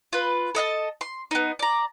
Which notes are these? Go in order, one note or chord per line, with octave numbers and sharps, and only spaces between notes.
F4 B4
A4 D#5 F5 A5
C6
B3 D#4
D5 A#5